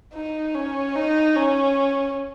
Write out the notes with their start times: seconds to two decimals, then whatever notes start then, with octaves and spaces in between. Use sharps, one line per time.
0.13 D#4
0.54 C#4
0.95 D#4
1.36 C#4